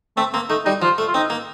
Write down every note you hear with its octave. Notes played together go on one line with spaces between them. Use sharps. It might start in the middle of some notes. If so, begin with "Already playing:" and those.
A3 C4
A#3 C4
A3 D#4
G3 D#4
F3 F4
A3
F4
C4 D#4
A#3